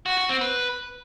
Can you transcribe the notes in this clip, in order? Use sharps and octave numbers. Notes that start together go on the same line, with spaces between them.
F#4
F#4
C4
B4